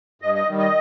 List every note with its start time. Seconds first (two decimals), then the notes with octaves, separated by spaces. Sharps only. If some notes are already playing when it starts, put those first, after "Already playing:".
0.22 G2 D#5
0.34 D#5
0.47 D#3 G3
0.58 D#5